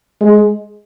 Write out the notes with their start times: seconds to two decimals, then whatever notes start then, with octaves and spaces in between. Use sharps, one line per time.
0.21 G#3